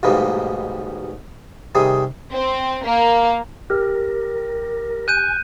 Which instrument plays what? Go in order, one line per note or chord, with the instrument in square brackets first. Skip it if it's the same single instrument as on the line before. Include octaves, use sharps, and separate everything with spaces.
[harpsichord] A1 D#2 G#2 B2 G3 A#3
C3 D#3 G3 G#4
[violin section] C4
A#3
[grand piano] G4 [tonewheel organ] A#4
[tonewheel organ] G#5 [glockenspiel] F#6 G6 D#7